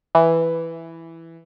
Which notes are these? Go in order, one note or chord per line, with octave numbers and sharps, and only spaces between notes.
E3